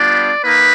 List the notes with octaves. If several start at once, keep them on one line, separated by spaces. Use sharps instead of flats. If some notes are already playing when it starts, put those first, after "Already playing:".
Already playing: G3 B3 D4 F4 D5
A#3 D#4 B4